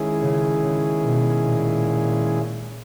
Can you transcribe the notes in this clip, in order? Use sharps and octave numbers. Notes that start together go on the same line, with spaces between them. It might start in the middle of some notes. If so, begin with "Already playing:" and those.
Already playing: D#3 G#3 C#4 E4 G#4
C#3
C#3
B2
A#2